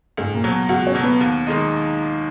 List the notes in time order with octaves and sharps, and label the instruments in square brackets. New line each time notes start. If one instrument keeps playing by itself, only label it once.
[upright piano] C#2 [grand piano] G#2 G#3
[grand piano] A#2 A#3
[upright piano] B2 F#3
[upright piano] C#2 [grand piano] F#3 F#4
[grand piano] C#4 C#5
[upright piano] B2 F#3
[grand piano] B3 B4
[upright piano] D#2
D#3 G#3 D#4